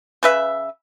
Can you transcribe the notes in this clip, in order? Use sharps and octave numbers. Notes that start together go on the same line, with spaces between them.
C#3 B4 E5